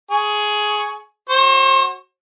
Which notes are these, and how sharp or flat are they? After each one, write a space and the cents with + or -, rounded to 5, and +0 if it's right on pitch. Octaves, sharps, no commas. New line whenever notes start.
G#4 +15 C#6 +0
F#4 +0 C5 +35 C#6 -5